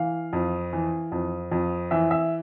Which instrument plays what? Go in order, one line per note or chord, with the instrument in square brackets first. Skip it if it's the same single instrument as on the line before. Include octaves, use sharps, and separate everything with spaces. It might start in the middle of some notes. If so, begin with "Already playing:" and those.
Already playing: [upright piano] E3 F5
F2
E3
F2
F2
E3 E5
E5